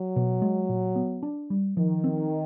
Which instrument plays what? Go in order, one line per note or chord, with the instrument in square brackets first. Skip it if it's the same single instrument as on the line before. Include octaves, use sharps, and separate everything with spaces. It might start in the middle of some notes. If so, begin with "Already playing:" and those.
Already playing: [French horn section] F#3
[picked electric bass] B2
G#3
A#2
B3
D4
G3
[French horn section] D#3 [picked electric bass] F3
[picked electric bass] C4